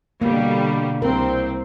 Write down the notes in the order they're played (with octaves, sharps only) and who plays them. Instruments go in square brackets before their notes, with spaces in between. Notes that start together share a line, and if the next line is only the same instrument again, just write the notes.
[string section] B2 D3 G3 [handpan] A#3
[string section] C2 C4 [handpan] A#4